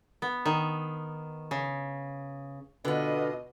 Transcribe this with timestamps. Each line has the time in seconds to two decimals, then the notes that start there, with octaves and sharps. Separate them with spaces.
0.22 B3
0.45 D#3
1.51 C#3
2.85 B2 D3 B3 F4 D#5